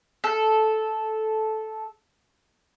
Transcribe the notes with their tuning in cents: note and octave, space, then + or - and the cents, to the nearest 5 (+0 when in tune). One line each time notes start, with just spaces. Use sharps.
A4 -10